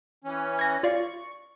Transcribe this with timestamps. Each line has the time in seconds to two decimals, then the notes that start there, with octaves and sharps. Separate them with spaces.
0.24 E3 C#4
0.59 G#6 A#6
0.83 F4 D5 F5 C#6